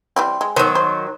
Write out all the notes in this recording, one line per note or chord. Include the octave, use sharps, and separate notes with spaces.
E3 G3 C4
G#3
D#3 F#3 B3 C5 C#5
C5